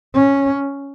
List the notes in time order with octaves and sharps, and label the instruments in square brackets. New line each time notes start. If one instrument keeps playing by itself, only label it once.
[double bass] C#4